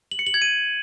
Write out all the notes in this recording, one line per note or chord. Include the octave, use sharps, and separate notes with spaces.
F#7
C#7
F#7
G#6
D#7